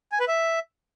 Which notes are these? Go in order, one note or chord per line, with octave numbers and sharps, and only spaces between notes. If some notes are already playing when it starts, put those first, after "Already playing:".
G#5
B4
E5